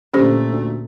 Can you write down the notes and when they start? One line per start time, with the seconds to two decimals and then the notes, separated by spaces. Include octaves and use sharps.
0.14 A#2 D3 A3 C#4 G4 C5
0.51 D2